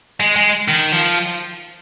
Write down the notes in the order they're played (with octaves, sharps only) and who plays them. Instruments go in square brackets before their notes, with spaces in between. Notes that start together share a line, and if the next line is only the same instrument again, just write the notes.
[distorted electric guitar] G#3
G#3
D#3
F3